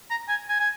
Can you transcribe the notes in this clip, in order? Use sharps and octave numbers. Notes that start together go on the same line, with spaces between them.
A#5
G#5
G#5
G#5